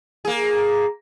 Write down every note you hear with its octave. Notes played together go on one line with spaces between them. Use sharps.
A#3 G#4